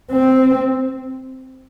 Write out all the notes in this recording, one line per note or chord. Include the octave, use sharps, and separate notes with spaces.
C4